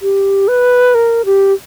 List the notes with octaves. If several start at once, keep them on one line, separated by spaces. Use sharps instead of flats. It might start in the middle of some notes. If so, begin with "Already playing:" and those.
G4
B4
A#4
G4